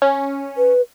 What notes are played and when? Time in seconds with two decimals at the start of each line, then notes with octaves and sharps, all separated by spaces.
0.02 C#4
0.57 B4